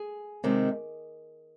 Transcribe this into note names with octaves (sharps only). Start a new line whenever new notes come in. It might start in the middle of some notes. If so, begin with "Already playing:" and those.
Already playing: G#4
C3 D#3 G#3